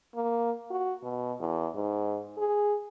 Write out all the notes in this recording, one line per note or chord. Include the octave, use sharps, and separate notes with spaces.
A#3
F#4
B2
E2
G#2
G#4